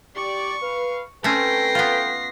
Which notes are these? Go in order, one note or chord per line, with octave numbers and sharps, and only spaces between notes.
G4 D5 C#6
B4 F5
A3 C4 C#4 A4 B4 G5 A#6 C7
B3 F4